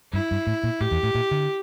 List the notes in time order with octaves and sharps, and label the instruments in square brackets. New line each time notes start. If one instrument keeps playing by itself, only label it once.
[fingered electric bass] G2 [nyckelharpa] E4
[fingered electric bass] G2
A2
A#2
[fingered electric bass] A2 [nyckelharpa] G4
[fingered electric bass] E2
A2
A#2
D3